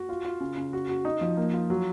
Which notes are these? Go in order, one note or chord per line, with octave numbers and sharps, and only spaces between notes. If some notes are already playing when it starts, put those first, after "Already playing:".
Already playing: F#4
F4
F4
C#3
C#3
F#4
F#4
D#4
F3
A#3
F4
F#3